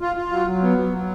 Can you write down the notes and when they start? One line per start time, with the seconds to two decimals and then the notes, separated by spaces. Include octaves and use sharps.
0.01 F4
0.17 F4
0.32 F#3
0.47 F#3
0.63 B3
0.78 F#3
0.93 F#3